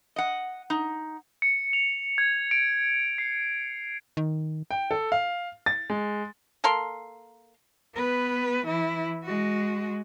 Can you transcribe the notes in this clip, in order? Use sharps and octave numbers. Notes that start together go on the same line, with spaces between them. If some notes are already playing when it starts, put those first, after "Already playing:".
D#5 F#5
D#4
C#7
F7
G#6
D7
C7
D#3
G5
A4
F5
A6
G#3
A#3 A4 A#4 C6
B3 B4
E3 E4
G#3 F#4